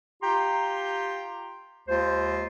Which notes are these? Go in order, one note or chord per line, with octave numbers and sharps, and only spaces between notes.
F4 G4 G5 A#5 C6
D#2 G#3 F4 C5